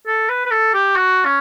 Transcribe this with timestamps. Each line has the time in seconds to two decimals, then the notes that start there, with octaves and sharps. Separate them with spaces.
0.07 A4
0.29 B4
0.46 B4
0.51 A4
0.74 G4
0.96 F#4
1.25 C#4